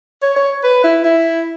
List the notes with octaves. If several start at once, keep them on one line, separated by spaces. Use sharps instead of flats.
C#5
C#5
B4
E4
E4